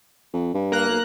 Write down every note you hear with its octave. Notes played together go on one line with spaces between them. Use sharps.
F2
G2
A#3 A#5 F#6
B1